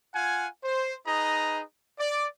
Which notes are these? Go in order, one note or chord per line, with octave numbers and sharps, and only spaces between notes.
F4 F5 F#5 G#5
C5
D#4 G#4 B4 D#5 A#5
D5